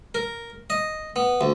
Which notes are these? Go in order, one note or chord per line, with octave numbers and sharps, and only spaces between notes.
A#4
D#5
B3
D2